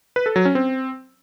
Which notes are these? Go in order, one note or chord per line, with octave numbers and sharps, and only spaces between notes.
B4
A4
F#3
C#4
C4